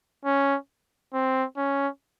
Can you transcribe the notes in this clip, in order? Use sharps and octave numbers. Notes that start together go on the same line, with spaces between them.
C#4
C4
C#4